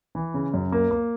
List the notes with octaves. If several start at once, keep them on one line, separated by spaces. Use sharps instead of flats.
E3
C#3
F#2
A#3
A#3